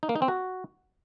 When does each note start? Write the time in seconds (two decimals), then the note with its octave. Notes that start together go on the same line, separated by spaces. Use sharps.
0.03 D#4
0.09 A#3
0.16 D#4
0.22 C4
0.28 F#4